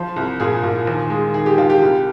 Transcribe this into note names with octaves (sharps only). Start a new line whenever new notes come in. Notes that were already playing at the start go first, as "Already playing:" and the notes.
Already playing: F3 C5
C2
A#2 G#4
A#2
D#2
G#3
D#3 G#4
G4
D#2 F4
G4
C2